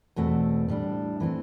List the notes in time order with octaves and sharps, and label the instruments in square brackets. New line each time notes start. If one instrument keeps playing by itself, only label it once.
[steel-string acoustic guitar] E2 B2 A3 C4
A2 G3 D4
E3 A3 C4